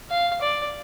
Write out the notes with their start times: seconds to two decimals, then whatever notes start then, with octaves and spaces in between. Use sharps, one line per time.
0.10 F5
0.42 D5